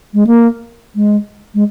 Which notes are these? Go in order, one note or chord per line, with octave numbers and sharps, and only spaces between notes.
G#3
A#3
G#3
G#3